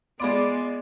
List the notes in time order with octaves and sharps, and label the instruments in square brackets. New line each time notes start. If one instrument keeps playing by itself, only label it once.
[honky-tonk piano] G#3 F4 D7 [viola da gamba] B3 [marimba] G#4 B5 C6 [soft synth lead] D5